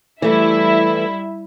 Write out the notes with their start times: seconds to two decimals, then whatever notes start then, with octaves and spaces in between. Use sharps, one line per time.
0.22 E3 G3 A3 E4 E5